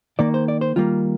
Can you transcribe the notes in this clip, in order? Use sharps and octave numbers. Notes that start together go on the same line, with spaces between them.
D#3 A#3 D5
C5
D5
C5
D#3 G3 A#3 F4